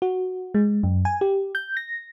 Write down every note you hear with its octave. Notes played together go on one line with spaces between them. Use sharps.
F#4
G#3
F#2
G#5
G4
G6
A#6